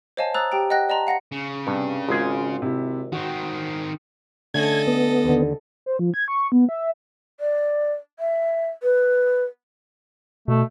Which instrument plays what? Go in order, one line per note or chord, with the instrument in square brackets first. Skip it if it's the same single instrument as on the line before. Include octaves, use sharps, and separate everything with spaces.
[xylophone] C5 C#5 D#5 F5 G#5 A5
C5 A#5 D#6 E6 F#6 A6
G4 G5 A#5 D7
D#5 F#5 G5 F#6 A#6
D5 D#5 A5 A#5 C6
F5 F#5 A#6 C#7
[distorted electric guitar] C#3
[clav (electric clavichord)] G2 [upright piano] C3 G3
[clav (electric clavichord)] G#1 G#4 [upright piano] G#3 F4
[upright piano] C3 E4
[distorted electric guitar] D#3 C4 [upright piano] F#4
[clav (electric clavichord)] D3 A3 C#4 [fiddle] A4 D#5 [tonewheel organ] G#6
[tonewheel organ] B3
[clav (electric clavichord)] D#2 D3
[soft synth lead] C5
F3
G#6
C#6
B3
E5
[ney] D5
E5
B4
[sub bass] B2 [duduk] A3